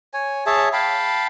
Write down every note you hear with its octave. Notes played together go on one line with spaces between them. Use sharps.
C#5 G#5
G#4 C#5 E5 A5
F5 G5 A5 B5